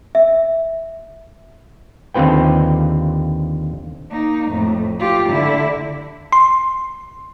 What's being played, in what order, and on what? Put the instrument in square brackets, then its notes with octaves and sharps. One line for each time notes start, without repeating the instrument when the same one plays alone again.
[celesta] E5
[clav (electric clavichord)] D#2 D3 C4 F4 B4 G5
[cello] A#3 D#4
F2 A2
F4 G4
D3 E4
[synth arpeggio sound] C6